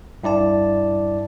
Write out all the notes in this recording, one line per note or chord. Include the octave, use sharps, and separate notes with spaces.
G2 E4 D5 A5